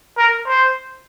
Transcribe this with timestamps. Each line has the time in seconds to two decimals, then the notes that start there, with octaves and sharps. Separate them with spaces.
0.18 A#4
0.47 C5